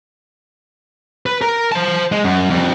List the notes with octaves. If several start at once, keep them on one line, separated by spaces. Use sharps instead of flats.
B4
A#4
C5 A5
G#3
F#2
F2 G3